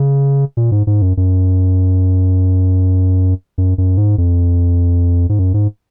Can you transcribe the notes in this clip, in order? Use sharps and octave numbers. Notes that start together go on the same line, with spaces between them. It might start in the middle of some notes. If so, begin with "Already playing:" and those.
Already playing: C#3
A#2
G#2
G#2
F#2
F#2
F#2
F#2
G#2
F2
G#2
F#2
G#2